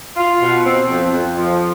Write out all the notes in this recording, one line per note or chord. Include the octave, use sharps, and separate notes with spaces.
F4
B2
C4
F2
F2
F3